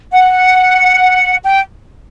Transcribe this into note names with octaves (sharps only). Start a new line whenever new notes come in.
F#5
G5